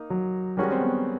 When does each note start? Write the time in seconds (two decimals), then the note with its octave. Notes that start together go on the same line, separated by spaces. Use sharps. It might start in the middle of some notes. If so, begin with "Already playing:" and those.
Already playing: A#3 D#4
0.10 F#3
0.57 D#3 G3 G#3 C#4 F#4 A#4
0.72 C4
0.81 B3